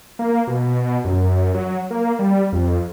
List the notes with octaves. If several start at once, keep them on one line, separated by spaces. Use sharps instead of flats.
A#3
B2
F#2
F#3
A#3
G3
F2